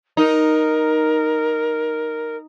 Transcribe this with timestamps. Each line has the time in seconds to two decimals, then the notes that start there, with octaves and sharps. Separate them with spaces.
0.17 D#4 A#4